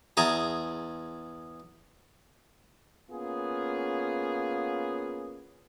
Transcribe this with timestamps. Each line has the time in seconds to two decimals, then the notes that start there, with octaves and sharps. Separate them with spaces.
0.17 E2 G#4 A5 A#5
3.11 A#3 B3 C#4 F4 G#4